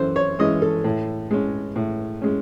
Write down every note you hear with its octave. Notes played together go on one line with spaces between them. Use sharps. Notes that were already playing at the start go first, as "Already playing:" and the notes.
Already playing: F#2 E3 C#4 A4 C5
C#5
E3 G#3 C#4 D#5
A4
A2
G#3 C#4
A2
G#3 C#4